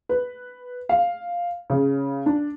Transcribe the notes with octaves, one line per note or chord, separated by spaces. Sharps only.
B4
F5
C#3
D4